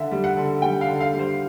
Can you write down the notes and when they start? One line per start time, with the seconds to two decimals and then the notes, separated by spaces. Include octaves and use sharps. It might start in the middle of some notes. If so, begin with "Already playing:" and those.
Already playing: D3 E5
0.11 G3
0.24 F#5
0.37 D3
0.62 G3 G5
0.81 F5
0.88 D3
1.00 F5
1.13 G3
1.19 C5